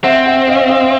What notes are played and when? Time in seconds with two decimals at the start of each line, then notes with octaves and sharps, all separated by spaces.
0.04 C4 E5 F#5
0.26 E5 F#5
0.47 D#5 F5
0.69 D#5 F5